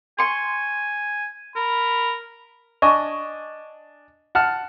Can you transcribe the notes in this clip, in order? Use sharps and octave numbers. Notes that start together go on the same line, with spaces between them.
G#5 C6 C#6
A#4 B5
D4 D#5 G#5 C#6
F#5 A5 F6